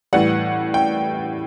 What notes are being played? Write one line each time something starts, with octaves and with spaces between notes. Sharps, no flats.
A2 E3 G3 F#5
G5